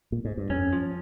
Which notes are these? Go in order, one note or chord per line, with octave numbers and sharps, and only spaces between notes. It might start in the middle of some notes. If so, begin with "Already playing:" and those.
A#2
G#2
G2
F2 C#4
F3